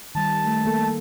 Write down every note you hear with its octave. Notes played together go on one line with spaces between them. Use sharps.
D#3 G3 A5
A3
A#3 A4